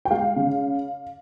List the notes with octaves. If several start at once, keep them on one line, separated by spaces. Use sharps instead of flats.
G5
G#3 F5
C#3